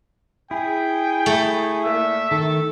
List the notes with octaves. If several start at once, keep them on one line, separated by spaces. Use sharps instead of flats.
E4 G#4 G5
A3
A#2 A#3 E5
D#3 A4